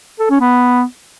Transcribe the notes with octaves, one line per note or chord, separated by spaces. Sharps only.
A4
C#4
B3